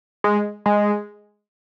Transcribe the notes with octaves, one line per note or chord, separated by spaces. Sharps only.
G#3
G#3